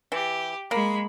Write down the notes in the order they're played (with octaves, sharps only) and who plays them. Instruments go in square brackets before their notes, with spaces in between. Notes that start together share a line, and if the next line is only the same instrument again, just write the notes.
[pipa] E3 [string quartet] G4
[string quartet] G#3 B5 [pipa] A#3